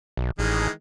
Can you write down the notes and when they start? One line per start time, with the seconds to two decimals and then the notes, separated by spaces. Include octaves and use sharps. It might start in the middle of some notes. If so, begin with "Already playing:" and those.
0.17 B1
0.39 A1 D#3 E3 G#3